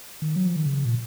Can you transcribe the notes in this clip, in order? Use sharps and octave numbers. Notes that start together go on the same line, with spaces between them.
D#3
F#3
F3
D#3
C#3
A#2